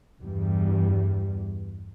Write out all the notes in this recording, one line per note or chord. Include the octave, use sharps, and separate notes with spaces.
E2 G2 G3